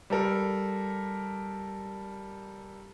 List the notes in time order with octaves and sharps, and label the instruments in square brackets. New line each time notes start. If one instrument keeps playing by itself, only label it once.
[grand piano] G3 A4 A#4